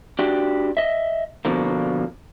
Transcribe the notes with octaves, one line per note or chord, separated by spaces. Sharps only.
D4 F#4 G4
D#5 E5
B2 D3 F3 A#3